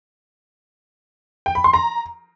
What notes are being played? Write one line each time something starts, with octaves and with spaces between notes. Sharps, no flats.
G5
B5
C6
A#5